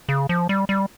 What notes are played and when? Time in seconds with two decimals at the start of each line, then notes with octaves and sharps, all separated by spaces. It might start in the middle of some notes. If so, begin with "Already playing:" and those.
0.09 C#3
0.29 F3
0.49 G3
0.69 G3